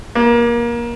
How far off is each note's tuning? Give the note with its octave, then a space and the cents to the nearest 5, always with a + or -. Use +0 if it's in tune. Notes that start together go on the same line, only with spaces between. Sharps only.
A#3 +20